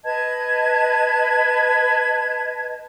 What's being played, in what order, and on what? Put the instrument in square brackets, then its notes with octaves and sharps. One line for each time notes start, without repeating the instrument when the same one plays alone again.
[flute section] B4 D#5 A5 G#6